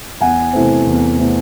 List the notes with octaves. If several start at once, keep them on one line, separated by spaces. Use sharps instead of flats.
E2 F#5 G#5
C3 E3 A3 C4
E2
C3 E3 A3 C4